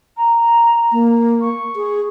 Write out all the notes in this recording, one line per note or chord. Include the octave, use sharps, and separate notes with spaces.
A#5
A#3
C#6
G#4